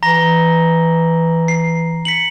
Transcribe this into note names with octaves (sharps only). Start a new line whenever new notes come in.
E3 A#5 A#6 G7
C7
B6 C#7 F#7